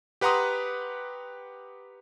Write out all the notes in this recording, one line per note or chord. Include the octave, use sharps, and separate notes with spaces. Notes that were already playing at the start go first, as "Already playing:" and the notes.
G4 B4 F#5 A#5 C6 D#6